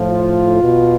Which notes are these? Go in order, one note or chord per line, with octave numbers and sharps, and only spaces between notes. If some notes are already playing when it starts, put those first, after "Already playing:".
Already playing: A2 F3
F4
B2